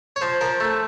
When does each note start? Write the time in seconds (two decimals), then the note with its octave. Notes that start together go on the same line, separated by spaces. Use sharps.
0.16 C#5
0.21 F3 C5
0.41 F3 A#4
0.60 A3